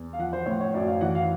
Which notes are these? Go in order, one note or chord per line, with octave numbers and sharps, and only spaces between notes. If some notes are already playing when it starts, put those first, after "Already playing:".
Already playing: E2
F5
F3 F#5
C5
A2 C#5
C#5
F#2 D5
F5
E3 F#5
F5